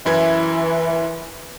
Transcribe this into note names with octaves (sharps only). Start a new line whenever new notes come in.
F#2 E3 E4 G#6